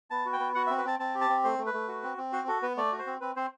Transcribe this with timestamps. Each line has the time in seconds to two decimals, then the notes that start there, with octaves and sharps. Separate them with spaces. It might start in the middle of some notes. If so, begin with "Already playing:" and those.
0.10 B3 A5
0.25 F#4
0.33 G5
0.40 B3
0.55 F#4 F#5
0.67 E5
0.70 C4
0.78 B4
0.85 C4 A5
1.00 C4 A5
1.15 G4
1.21 A5
1.30 C4
1.44 A3 C5
1.58 A3
1.66 B4
1.74 A3
1.88 F#4
2.03 C4
2.17 C4
2.32 F#4 C5
2.48 F#4 A4
2.62 B3 B4
2.77 A3 D5
2.92 F#4
2.99 C5
3.06 C4
3.21 C4 B4
3.36 C4 C5